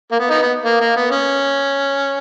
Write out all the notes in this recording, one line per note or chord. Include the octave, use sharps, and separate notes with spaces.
A#3
B3
B3 D#4
B3
A#3
A#3
B3
C#4